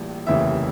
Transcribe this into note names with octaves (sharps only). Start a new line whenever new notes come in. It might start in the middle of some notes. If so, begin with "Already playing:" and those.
Already playing: A#1 A2 E3 G3
F1 D#2 C#3 E3 E5